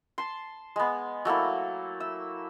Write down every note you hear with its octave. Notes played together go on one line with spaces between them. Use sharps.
A5 C6
G#3 B3
F#3 A3 A#3 E4
E5